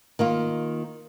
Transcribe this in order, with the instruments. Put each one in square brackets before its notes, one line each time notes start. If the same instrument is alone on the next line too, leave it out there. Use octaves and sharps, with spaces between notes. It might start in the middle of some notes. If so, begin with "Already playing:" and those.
[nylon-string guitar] D#3 A#3 F4